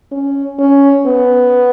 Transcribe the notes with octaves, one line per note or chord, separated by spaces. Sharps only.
C#4
C#4
B3